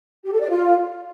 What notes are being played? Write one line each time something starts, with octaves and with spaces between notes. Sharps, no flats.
G4
A4
D5
F4